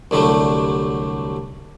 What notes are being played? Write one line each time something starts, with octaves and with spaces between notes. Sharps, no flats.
C2 D3 F#3 G3 A3